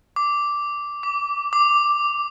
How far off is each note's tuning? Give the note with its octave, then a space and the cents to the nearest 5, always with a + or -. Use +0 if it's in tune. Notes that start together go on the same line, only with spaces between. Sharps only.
D6 -5
D6 -25
D6 +5